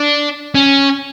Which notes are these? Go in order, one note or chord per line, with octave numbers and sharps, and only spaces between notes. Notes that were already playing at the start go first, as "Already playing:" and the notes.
Already playing: D4
C#4